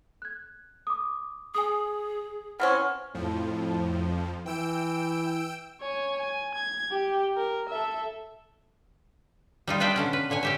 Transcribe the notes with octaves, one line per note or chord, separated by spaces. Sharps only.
F#6 G#6
D6 D#6
G#4 G#5 D#6
E3 C4 C#4 F#5 F6
F2 A2 F3
E3 G5 E6 D7
C#5 G#5
G#5
G#6
G4
A#4
A4 E5
G3 D#4 F4
D4 F4 B4 D5 E5 G5
B2 D3 C#4
B4
A#2 D3 C#5 G#5
C#4 G4 E5